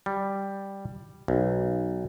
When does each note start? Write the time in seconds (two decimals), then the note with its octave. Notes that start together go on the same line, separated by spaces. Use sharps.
0.06 G3
1.28 B1